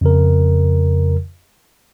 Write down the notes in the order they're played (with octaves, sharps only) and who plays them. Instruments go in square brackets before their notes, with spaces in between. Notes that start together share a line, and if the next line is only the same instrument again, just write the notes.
[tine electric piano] F2 C#3 A#4